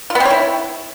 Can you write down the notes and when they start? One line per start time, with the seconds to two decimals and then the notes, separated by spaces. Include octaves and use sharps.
0.10 F4
0.15 B3
0.20 C4
0.25 C#5
0.30 E4